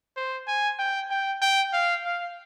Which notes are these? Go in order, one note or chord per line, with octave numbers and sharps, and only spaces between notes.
C5
G#5
G5
G5
G5
F5
F5